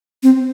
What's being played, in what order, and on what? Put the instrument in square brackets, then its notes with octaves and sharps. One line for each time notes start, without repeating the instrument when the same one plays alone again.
[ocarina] C4